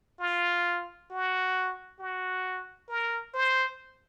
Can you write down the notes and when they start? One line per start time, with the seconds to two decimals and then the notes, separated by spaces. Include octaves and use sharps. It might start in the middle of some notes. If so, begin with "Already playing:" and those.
0.20 F4
1.10 F#4
1.99 F#4
2.89 A#4
3.34 C5